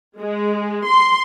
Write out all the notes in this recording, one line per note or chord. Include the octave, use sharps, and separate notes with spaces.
G#3
C6